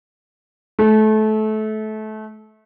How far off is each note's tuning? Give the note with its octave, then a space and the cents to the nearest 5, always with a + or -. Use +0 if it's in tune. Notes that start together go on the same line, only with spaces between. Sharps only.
A3 -25